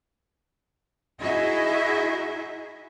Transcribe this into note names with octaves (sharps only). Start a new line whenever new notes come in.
D#4 E4 F#4 G#4 D#5 E5